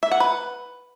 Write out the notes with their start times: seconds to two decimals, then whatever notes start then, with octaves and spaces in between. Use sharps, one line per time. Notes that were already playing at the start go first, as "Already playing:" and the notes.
0.03 E5
0.11 F#5
0.20 B4